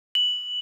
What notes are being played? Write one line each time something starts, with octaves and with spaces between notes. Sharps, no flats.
F#7